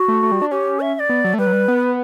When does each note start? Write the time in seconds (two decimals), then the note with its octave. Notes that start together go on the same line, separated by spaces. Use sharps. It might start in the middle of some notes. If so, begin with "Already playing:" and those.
Already playing: F#4
0.08 A3
0.23 A3
0.32 G3
0.42 D4
0.51 C#4 G4
0.80 E5
0.95 E5
0.99 D5
1.09 B3
1.24 F#3
1.34 A3
1.39 G3 B4
1.47 F#3
1.53 G3
1.68 B3